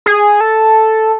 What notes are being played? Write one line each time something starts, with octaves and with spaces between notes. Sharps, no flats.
G#4
A4